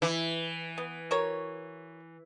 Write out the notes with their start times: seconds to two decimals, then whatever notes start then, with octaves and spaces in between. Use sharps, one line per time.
0.02 E3 E4
0.78 B3
1.11 F#4 A#4 C#5